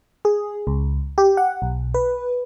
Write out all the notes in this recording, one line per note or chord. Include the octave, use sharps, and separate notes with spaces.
G#4
C#2
G4
F#5
B1
B4